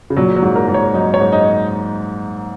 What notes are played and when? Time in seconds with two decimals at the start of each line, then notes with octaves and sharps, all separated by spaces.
0.10 C#3
0.16 A#2 F#3
0.36 F#3
0.42 G#2
0.56 A#4
0.68 G#2
0.74 C#5
0.94 F#2 D#4
1.14 C#5
1.20 G#2
1.33 D#4